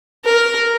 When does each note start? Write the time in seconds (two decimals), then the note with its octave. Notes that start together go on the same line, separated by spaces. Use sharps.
0.25 A#4